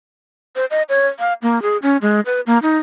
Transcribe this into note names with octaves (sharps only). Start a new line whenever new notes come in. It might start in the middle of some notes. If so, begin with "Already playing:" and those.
C5
D#5
C#5
F5
A#3
G#4
C#4
G#3
B4
A#3
D#4